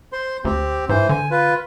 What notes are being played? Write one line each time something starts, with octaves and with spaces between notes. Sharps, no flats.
C5 C6
D2 C4 G4
G#2 E3 C5
D3 G#5
F4 B4